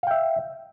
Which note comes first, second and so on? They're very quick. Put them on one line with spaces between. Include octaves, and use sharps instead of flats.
F5 G5 E5